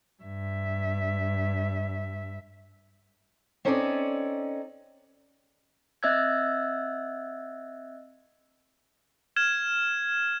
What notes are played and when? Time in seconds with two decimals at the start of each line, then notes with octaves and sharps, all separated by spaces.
0.23 G2 E5
3.65 C4 C#4 D#4 A4 C#5 D5
6.03 C4 D#5 E5 E6 F#6 G#6
9.36 F6 G#6 E7